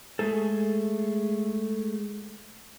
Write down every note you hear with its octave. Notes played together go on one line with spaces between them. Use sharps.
G#3 A3 G#4 A4